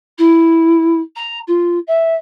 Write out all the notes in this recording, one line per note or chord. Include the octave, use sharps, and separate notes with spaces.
E4
A#5
F4
E5